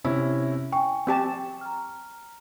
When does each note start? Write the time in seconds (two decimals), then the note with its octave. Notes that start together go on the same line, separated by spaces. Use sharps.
0.04 C3 C#4 E4
0.72 G5 G#5 C#6
1.07 C4 G4 A5
1.34 G5
1.61 A#5 F6